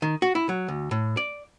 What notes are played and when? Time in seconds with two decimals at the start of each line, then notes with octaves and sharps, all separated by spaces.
0.02 D#3
0.22 F#4
0.35 E4
0.49 F#3
0.68 D2
0.91 A2
1.17 D5